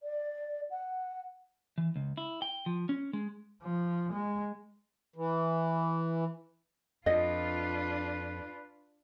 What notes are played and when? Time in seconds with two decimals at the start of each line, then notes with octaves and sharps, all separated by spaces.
0.03 D5
0.71 F#5
1.78 E3
1.96 C#2
2.17 E4
2.42 G5
2.66 F3
2.89 C#4
3.13 G#3
3.62 F3
4.12 G#3
5.16 E3
7.06 F2 D4 F4 B4 D#5